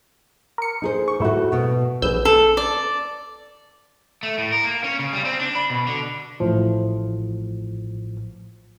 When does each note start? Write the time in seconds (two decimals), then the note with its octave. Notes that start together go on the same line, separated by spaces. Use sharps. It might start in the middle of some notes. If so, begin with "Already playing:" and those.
0.58 A#4 C#7
0.82 D#4 G#4 C5
1.08 C#6
1.20 G#2 A3 E4 F#4
1.52 B2
2.02 A#1 G#4 B4 E6 G6
2.25 A4
2.57 D5
4.23 A3
4.38 A2
4.52 A#4
4.64 A#3
4.84 C#4
4.99 C#3
5.13 G3
5.25 C4
5.40 D4
5.55 B5
5.70 B2
5.87 D3
6.40 A1 A2 F3